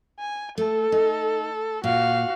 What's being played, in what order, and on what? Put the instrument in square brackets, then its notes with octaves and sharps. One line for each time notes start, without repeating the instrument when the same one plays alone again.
[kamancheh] G#5
[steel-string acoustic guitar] A3 [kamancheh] A4
[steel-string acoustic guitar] D#4
[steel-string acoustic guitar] A#2 [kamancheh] F#4 F5